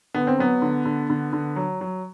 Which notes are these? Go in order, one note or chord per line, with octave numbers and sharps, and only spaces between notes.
D3 B3
C4
F#3 B3
D3
D3
D3
D3
F#3
F#3